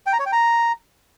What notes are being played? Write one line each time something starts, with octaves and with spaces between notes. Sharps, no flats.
G5
A#5
C#5
G5
A#5